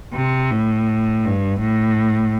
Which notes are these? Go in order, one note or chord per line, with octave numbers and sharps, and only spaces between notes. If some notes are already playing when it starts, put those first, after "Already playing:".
C3
A2
G2
A2